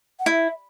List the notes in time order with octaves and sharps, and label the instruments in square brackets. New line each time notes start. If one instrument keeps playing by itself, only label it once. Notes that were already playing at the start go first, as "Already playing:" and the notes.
[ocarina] F#5
[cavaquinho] E4 [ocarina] E5